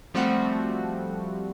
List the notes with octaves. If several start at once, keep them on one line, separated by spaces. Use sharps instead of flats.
F3 G3 A3 C4 F#4